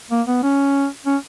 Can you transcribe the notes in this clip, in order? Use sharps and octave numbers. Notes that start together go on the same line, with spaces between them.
A#3
B3
C#4
C#4